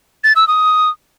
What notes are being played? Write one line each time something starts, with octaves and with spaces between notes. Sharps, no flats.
A6
E6
D#6